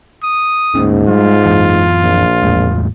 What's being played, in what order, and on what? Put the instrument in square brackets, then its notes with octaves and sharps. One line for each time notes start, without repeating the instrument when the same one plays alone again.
[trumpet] D#6
[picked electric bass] D2 A#3 C#4 [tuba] G#2
[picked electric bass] G3 G#3 [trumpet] F4
[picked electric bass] F#2 E3
[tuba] A#1
[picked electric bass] E2 A2 G#3